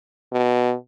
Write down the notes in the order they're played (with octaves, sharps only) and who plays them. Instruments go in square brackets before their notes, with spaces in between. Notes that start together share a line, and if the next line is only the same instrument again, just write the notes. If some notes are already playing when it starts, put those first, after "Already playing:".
[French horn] B2